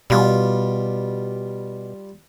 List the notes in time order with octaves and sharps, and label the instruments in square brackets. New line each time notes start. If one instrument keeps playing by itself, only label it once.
[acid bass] B2 [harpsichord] G3 F4